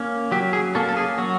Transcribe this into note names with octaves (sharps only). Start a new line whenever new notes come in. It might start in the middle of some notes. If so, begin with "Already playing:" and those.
Already playing: A#3 C#4
F#3 G4
G#4
A#3 C#4 A4
A4
G#4
F#3 F#4